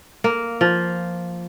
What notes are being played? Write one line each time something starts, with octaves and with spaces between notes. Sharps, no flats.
A#3
F3